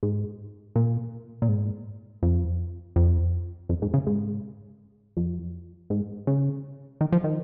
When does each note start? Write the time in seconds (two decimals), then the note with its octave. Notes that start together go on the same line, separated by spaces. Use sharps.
0.03 G#2
0.76 A#2
1.42 A#2
1.49 G#2
2.23 F2
2.96 F2
3.69 F2
3.82 G#2
3.94 C#3
4.07 G#2
5.17 F2
5.90 G#2
6.27 C#3
7.01 D#3
7.12 F3
7.24 D#3